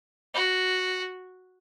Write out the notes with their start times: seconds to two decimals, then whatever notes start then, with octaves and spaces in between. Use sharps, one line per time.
0.34 F#4